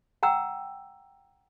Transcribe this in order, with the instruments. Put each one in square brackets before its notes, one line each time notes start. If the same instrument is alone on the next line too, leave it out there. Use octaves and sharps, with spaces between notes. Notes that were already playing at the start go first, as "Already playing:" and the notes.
[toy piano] F#5 G5 A#5 E6